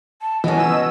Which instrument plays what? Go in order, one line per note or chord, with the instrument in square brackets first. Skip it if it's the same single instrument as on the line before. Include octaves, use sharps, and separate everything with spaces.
[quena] A5
[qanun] B2 C#4 [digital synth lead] E3 [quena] D#5
[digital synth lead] E6